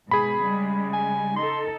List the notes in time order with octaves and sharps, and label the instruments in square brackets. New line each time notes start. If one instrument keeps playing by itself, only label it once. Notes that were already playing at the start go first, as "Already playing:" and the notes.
[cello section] G#2 B2 [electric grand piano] G#4 B5
[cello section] C#3 G3 G#3
[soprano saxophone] G#5
[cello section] D#4 A4 [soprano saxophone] C6